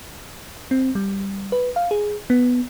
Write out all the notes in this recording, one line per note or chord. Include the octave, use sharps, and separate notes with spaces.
C4
G3
B4
F5
G#4
B3